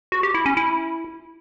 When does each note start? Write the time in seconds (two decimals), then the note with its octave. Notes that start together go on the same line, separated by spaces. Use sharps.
0.12 F#4
0.23 G4
0.34 E4
0.46 C#4
0.57 E4